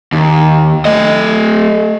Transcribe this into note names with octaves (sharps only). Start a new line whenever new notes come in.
D#2
A3 D#5